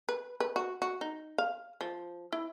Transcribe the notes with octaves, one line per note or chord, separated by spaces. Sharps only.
B4
B4
F#4
F#4
D#4
F5
F3
E4